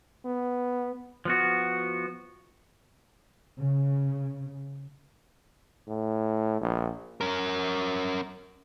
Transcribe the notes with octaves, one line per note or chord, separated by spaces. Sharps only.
B3
F3 B3 F#4
C#3
A2
A#1
C#4 A#4